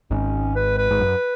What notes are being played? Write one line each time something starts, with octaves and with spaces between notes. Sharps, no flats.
G#1 G#2 C#4
B4
B4
G#2
F#2